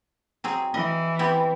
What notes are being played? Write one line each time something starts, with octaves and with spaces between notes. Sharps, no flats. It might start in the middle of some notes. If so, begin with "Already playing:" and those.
F#3 C4 G#4
E3 D#5
B3 C4 G4